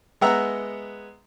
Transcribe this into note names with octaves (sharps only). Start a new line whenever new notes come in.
G#3 B3 E5 F#5 A#5 E6